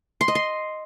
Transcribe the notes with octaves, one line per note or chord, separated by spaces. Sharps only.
C6
D#5
C6